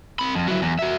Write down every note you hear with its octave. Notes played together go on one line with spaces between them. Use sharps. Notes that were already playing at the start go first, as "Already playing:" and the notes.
C4 B5
F2
F#3 E4
E2
F#4 E5